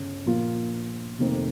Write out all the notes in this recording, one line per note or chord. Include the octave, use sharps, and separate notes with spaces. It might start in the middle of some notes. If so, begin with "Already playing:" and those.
Already playing: G1 C#3
A#2 F3 A#3 F4
F1 F2 D#3 A#3